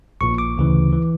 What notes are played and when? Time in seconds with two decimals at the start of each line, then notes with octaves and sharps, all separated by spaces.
0.21 A#1 A#2 C#6
0.38 D6
0.58 D2 C#3 E3
0.93 E3